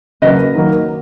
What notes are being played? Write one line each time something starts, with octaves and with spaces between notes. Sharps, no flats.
C#3 F#3 A#3 B4 D#5
D#3 F#3 A#3